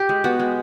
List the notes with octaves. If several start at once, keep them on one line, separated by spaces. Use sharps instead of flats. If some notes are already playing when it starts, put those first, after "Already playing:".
Already playing: G4
G#3
B3 F#4
G#3